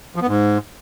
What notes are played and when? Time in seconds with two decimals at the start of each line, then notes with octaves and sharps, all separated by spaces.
0.16 F3
0.22 B3
0.28 G#2